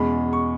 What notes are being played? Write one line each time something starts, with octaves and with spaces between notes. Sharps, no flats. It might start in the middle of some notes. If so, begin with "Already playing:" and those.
Already playing: E2 B2 G#3 C#4 B5
C#6